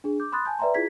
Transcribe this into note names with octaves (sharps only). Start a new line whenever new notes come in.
D4 G#4
D6 G6
B5 C6 D#6 F#6 A6
G#5 A5 G6
B4 D5 E5 G5 A#5 C6
E4 F4 G#4 G#6 B6